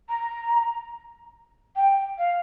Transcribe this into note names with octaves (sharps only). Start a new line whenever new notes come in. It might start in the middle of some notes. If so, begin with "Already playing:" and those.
A#5
G5
F5